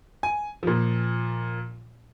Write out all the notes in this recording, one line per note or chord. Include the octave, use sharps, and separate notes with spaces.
G#5
A#2 F3